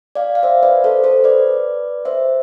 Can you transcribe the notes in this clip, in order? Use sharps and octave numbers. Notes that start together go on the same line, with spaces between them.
D5 F5
F5
C5 E5
B4 D5
A4 C5
A4 C5
B4 D5
C5 E5